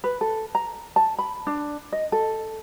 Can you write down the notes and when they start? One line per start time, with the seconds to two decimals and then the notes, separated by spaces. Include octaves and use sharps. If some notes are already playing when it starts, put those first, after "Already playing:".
0.04 B4
0.21 A4
0.55 A#5
0.96 A5
1.19 B5
1.47 D4
1.92 D#5
2.12 A4